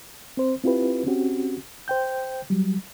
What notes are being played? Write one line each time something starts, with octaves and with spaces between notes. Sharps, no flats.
C4 C5
C4 E4 F4 G4 B4
C4 C#4 F#4 G4
C5 G5 G6
F#3 G3